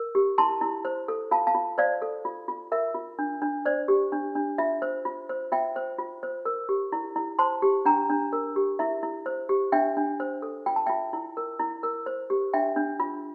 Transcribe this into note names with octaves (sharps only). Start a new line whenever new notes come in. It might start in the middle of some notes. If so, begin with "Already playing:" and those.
Already playing: A#4
G4
E4 A5 C6
E4
C5
A4
F4 F5 A5
F5 A5
F4
C5 D5 F5
A4
F4
F4
A#4 E5
F4
D4
D4
C5 D5
G4
D4
D4
F4 E5
C5
F4
C5
F4 E5 G5
C5
F4
C5
A#4
G4
E4
E4
C5 A5 C6
G4
D4 G5 A#5
D4
A#4
G4
E4 E5
E4
C5
G4
D4 E5 G5
D4
C5
A4
F4 G5
A5
F4 E5 G5
E4
A#4
E4
A#4
C5
G4
D4 E5 G5
D4
F4